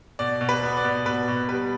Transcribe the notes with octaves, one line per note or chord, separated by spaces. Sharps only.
B2 D5
B2
B4
B3
D5
B2
B2 B4
B2
G3 B4